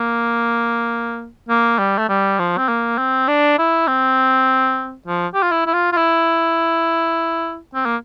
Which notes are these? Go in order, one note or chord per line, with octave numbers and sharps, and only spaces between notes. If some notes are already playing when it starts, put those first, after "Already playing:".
Already playing: A#3
A#3
G3
A3
G3
F3
C4
A#3
C4
D4
E4
C4
F3
G4
F4
E4
E4
F4
F4
E4
C4
A#3